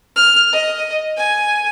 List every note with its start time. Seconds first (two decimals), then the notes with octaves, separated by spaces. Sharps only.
0.16 F6
0.53 D#5
1.17 G#5